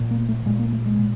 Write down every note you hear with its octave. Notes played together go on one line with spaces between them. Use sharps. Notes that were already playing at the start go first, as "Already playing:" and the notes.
Already playing: A#2
A#3
A3
A#2 G#3
A#3
A3
G#3
A#2